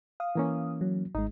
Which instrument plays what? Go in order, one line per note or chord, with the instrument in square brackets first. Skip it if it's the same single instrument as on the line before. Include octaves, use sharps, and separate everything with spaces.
[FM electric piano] F5 D#6
[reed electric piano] E3 A#3 C#4
[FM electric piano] F#3
[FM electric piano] G#1 G#3 [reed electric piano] D#4